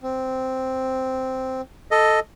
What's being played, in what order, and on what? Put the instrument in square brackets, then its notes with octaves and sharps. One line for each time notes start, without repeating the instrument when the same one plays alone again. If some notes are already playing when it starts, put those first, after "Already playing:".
[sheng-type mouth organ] C4
[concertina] A4 D#5